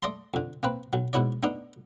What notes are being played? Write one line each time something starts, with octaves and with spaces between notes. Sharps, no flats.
A3 D5 D#5 A5 C6
F2 D3
A#3 C4 B4
B1 F#3
G#2 B2 B3 E4 C#5 D5
A3 B3 D4 D#4